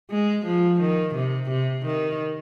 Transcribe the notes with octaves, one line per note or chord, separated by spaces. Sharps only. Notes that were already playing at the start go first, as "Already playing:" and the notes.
G#3
F3
D#3
C3
C3
D#3